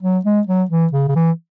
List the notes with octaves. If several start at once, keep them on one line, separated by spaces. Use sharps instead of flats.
F#3
G#3
F#3
E3
C#3
C#3
E3